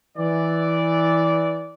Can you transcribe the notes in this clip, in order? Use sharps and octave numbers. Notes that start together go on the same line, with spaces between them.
E3 D5